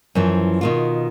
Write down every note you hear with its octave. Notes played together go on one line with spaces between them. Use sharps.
F#2 E3 F3
B2 D#3 F4